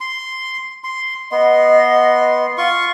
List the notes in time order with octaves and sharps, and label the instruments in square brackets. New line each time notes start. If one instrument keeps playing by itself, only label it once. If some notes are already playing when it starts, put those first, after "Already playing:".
[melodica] C6
C6
[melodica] B3 C6 [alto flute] D#5
[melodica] F4 C6 C#6